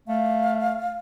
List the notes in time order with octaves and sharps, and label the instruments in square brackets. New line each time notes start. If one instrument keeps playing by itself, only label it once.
[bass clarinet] A3 [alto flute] F5